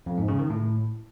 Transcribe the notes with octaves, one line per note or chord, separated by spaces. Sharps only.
F2
G#2
C#3
D#3
A2